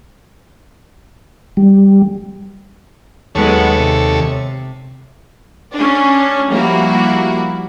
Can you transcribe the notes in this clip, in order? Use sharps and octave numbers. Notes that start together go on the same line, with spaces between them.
G3
D#2 F#3 G#3 B3 A4 C#5
C3
C#4 D4
F3 G3 A#3 E4 F#4